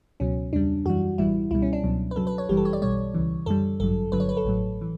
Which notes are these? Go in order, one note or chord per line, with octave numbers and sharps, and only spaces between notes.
C#2 B2 F#3 C#4
E2 C#3 G3 D4
F#2 E3 G3 F#4
A1 G2 E3 G3 E4
C#2 B2 G3 E4
C#4
D4
C#2 B2 F#3
B4
F#2 C#3 F#3 A4
B4
C#5
G1 F#2 E3 G3 G4
A4
C#5
D5
B1 B2 G3 C#5
C#2 C#3 E3
F#2 D3 G3 A4
A1 G2 D3 F#3 A4
G1 G2 D3 F#3 B4
C#5
B4
A4
A1 A2 F#3
E3